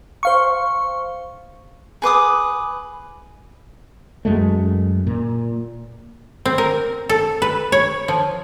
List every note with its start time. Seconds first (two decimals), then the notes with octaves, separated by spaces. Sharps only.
0.23 C5 F5 C#6
2.02 G#4 B4 D6 D#6
4.25 F#2 G#3 A3
5.07 A#2
6.46 C4
6.58 A#4
7.09 A4
7.42 B4
7.72 C#5
8.08 F3